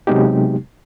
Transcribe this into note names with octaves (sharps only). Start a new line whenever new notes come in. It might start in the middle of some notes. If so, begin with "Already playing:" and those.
C3 F#3 G#3 B3 D#4 G4